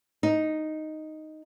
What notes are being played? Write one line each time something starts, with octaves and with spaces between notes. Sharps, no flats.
D#4